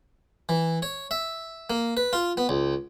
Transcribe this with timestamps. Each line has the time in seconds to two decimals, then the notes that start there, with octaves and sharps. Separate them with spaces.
0.49 E3
0.82 C#5
1.11 E5
1.70 A#3
1.97 B4
2.13 F4
2.37 B3
2.49 C#2